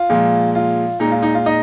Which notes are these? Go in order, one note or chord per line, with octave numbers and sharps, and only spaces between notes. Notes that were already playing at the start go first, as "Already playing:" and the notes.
Already playing: F4
A#2 F3 G#3
F4
A#2 G#3 D#4
F4
D#4
F4
D#4 D#5